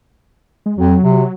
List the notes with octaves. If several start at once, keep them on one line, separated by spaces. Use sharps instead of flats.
G#3
F2 F#3
C3